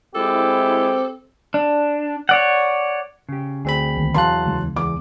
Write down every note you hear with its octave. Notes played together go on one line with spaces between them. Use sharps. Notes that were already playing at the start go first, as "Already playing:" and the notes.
G#3 C4 E4 G4 A4
D4
C#5 D5 F#5
C#3 G4
D2 C4 G#4 B5
C2 D#3 A#3
E2 C3 E3 F#3 F5 A5 C6 F#6
D2 C#3 G#3
E2 D6